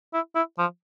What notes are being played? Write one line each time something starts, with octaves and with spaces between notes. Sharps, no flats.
E4
E4
F3